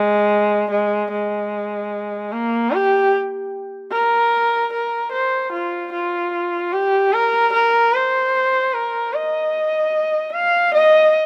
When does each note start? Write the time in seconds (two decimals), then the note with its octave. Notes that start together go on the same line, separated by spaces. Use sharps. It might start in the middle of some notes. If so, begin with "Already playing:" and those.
Already playing: G#3
0.71 G#3
1.11 G#3
2.32 A#3
2.72 G4
3.92 A#4
4.73 A#4
5.12 C5
5.52 F4
5.93 F4
6.73 G4
7.13 A#4
7.53 A#4
7.93 C5
8.74 A#4
9.13 D#5
10.34 F5
10.74 D#5